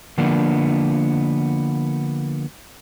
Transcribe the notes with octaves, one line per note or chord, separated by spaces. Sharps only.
D3 F3 A#3 B3 D4